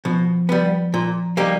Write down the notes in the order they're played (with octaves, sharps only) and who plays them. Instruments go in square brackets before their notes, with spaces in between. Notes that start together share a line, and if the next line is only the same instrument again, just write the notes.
[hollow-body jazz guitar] B2 [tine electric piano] F3
[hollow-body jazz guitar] G3 B3
A#2
G3 A#3 D#4 G4